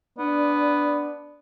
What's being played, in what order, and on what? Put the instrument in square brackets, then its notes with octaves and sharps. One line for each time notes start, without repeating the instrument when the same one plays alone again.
[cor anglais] B3 [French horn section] D4 D5